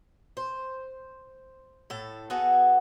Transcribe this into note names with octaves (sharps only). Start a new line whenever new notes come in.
C5
A2 A4
B3 F#4 G#4 A4